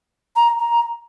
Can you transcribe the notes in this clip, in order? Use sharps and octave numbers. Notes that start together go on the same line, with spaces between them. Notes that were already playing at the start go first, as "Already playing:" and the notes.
A#5
A#5